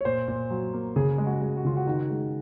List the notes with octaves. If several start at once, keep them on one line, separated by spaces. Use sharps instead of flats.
C#5
A#2 C5
A#2
F#3
A#3
C#3 G#4
G#3
F#4
G#3
F#4
C#3 F4
F#4
D#3 F#4
G#3